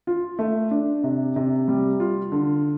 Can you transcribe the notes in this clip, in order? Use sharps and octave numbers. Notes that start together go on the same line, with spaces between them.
F4
A3
D4
C3
C3
G3
F4
D3